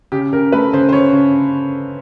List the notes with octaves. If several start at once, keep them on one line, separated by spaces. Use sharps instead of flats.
C#3 G4
C#3 A#4
A3 B4
C#3 C5
C5
C#3 C#5
C#3